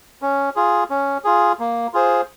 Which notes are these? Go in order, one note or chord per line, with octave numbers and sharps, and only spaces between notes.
C#4
F4 G#4
C#4
F4 G#4
A#3
F4 G#4 C5